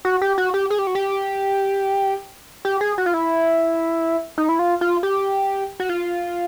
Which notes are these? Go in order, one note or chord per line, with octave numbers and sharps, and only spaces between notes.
F#4
G4
F#4
G4
G#4
G4
F#4
G4
G4
G#4
F#4
F4
E4
D#4
E4
F4
F4
G4
F#4
F4